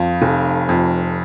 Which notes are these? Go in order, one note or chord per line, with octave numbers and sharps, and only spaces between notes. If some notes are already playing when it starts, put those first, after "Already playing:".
Already playing: F2 F4
F1
F2